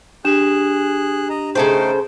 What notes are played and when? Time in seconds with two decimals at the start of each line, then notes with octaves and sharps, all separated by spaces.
0.25 D4 G4 G#4 F#6 E7
1.30 D#5 A#5
1.55 C#3 A3 D#4 A4 C5 G5